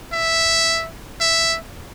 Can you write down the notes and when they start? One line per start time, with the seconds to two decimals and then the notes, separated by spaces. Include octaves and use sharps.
0.13 E5
1.20 E5